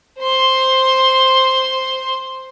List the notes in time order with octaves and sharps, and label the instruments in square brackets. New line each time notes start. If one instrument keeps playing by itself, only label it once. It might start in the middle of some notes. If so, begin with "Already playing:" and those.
[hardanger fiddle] C5 C6